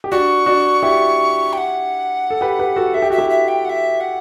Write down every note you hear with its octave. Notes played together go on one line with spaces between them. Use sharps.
G4
D4 F#4 C#6
D4 F#4
E4 G4
G5
F#5
A4
G4 B4
G4 B4
F#4 A4
A4 E5
G4
F#4 E5
E4 G4
E5
G5
F#5
E5
F#5